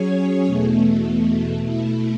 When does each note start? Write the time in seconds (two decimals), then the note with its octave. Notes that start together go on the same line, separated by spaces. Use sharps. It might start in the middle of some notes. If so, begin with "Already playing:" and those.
Already playing: F#3 C#4 G#4 C#5
0.46 E2 B2 A3
1.57 B2 A3 E4